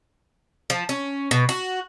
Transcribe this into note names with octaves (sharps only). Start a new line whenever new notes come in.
F3
C#4
B2
F#4